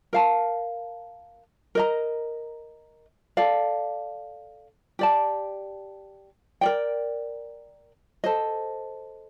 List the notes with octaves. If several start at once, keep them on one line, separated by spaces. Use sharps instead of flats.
A#4 F5 A5
A#4 D#5 A#5
A4 D5 F5
G4 D5 A5
A#4 D5 G5
A4 C5 D#5